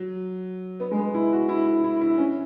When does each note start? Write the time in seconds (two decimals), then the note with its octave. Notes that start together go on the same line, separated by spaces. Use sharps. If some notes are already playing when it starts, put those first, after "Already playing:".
Already playing: F#3
0.80 B3
0.91 G#3
0.98 B3
1.14 E4
1.33 F#4
1.49 E4
1.67 E4
1.84 E4
2.01 E4
2.18 C#4